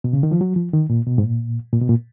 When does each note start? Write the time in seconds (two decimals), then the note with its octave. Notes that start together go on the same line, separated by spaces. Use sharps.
0.04 B2
0.13 C#3
0.23 D#3
0.31 F3
0.41 F#3
0.56 F3
0.74 D#3
0.90 A#2
1.07 B2
1.18 G#2
1.23 A#2
1.73 A#2
1.81 B2
1.89 A#2